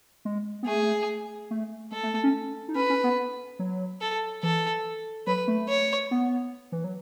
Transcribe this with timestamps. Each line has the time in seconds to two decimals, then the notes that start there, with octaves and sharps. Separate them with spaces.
0.25 G#3
0.63 B3
0.67 A3 G#4
1.51 A3
1.92 G#3 A4
2.03 A3
2.14 A3
2.24 C#4
2.68 D#4
2.75 C#4 B4
2.90 C#4
3.04 B3
3.59 F#3
4.01 A4
4.43 E3 A4
5.27 F#3 B4
5.48 A3
5.69 C#5
6.11 B3
6.72 E3
6.84 F#3